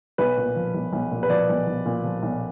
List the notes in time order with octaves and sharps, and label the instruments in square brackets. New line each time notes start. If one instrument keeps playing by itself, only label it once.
[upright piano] B1 B4
A#2
F3
B1
B1
A#2
B4
F3 D5
B1
B1
A#2
F3
B1